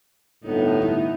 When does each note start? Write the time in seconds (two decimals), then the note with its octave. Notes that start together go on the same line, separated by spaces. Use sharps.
0.44 G1 A2 B3 D#4
0.82 E4